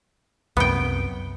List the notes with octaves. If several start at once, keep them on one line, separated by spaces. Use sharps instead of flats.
C2 F#2 B3 G5